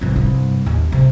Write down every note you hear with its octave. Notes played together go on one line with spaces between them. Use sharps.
C2 G2
C2 G2
D#2 C4
C3